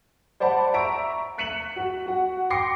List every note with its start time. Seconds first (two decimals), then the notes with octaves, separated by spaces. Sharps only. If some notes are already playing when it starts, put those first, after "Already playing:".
0.40 C5 D5 F#5 A5 B5
0.74 E5 A#5 C#6 D7
1.38 F#6 B6 C#7 D#7 E7 F#7
1.76 F#4
2.06 F#4 F#5
2.50 G5 C6 D6 A#6 C7 C#7